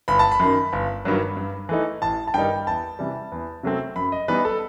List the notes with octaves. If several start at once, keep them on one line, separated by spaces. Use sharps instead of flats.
G1 B5
A5
B5
F#2 D#3
G1
G2 D#3 F#3
G2
E3 A3 D#4
A1 A5
A5
G2 D#3 G3 D#4 G5
E2 A5
C3 E3 G3
E2
C3 F#3 A3 C4
F#2 B5
D#5
E3 G3 B3 D#4 B4
A4